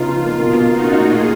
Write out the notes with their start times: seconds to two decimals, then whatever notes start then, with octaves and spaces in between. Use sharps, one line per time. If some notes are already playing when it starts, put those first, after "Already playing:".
Already playing: C#3 B3 D#4 F4
0.09 F3
0.25 A#3
0.40 B2 F4
0.54 B2
0.69 A#3 D#4 F#4
0.84 C#4
0.98 A#2 F4 G#4
1.14 A#2